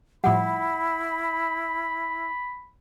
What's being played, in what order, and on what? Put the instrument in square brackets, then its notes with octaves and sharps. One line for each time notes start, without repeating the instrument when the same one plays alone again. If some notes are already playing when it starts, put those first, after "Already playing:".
[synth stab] A2 F3 G3 [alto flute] E4 [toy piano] F#5 [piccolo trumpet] B5